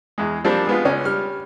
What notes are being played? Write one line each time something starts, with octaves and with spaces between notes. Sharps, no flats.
E2 G#3
F3 G3 A#3 C4 D4
G#3 B3 F4
C#2 C#4
G3 F6